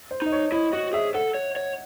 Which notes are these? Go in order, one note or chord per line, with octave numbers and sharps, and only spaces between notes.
C5
D#4 D#5
C#5
E4 D#5
F#4 D#5
G#4 E5
A4 F#5
C#5
C#5